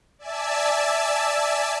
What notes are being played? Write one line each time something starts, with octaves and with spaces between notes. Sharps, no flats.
D5 E5 G#5 A5 E6